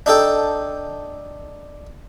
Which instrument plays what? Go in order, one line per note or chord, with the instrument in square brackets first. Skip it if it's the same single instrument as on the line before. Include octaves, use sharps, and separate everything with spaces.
[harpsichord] D4 D#4 A4 G5